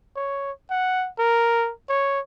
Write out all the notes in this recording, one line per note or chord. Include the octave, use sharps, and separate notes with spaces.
C#5
F#5
A#4
C#5